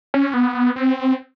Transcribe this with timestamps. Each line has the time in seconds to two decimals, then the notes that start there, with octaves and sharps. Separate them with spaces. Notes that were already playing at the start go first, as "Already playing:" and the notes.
0.14 C#4
0.34 B3
0.76 C4